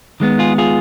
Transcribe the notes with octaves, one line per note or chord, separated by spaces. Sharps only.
D#3 G#3 B3
F4 G#4
F4 G#4